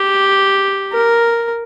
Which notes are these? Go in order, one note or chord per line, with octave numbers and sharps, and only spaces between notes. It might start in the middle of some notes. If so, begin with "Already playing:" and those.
Already playing: G4
A#4